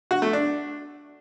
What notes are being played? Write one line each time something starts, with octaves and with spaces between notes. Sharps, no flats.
F#4
A3
D4